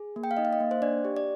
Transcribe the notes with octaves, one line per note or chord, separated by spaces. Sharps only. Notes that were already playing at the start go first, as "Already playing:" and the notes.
Already playing: G#4
A#3
G5
F5
D#4 D#5
F5
D#5
A#3
C5
D4 D5
G4
D5